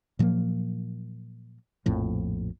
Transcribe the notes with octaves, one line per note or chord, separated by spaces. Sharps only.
A#2 F3 F#3 A#3
A#1 F2 A2 F3